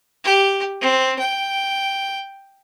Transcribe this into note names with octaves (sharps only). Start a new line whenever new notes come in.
G4
C4
G5